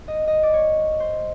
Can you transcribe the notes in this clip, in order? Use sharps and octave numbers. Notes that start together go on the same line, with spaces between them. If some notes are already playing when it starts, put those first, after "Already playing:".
D#5
D#5
D5
C#5
C5